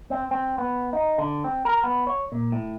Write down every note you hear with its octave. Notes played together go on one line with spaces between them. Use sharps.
C4
C4
B3
D#4
D3
C4
A#4
B3
C#5
A#2
A2